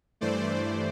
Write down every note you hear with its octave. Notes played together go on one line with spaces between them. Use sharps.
G2 E3 A3 C5 D5